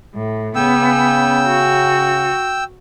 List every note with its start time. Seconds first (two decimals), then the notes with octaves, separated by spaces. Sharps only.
0.14 A2
0.55 C#3 B3 G5 E6
1.47 F#4